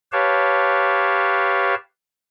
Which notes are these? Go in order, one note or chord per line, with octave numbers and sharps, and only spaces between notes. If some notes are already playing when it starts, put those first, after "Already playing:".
G4 B4 C#5 F5 A5